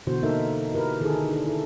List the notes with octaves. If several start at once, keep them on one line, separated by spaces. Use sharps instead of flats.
B2 D3 E3 F#4 C5
A#3 D#4 A4 A#4 E5
E4 G4 A#4 B4
D3 D#3 E4 G#4 A4
D4 A4
E4 A4